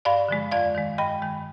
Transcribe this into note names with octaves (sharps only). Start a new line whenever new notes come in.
G2 D5 F5
D3 F3 G#3
F2 D5 F5
D#3 G#3
G2 D#5 G5
D#3 G#3